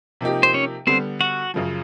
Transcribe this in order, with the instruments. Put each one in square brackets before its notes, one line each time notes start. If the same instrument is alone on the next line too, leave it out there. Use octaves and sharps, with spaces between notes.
[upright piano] C3 F3 A#3 D#4 G4
[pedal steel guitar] C5
C#4 C#5
[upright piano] D3 G3 B3 [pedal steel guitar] C4 C5
[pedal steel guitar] F#4 F#5
[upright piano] F#2 C#3 F3